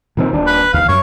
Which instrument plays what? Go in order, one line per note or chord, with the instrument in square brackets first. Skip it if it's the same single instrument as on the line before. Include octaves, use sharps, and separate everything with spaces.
[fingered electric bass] A#2 D#3 C4
D#1 D4
[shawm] B4
[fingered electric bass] D#2 [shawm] F5
[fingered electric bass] F#2 [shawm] C#5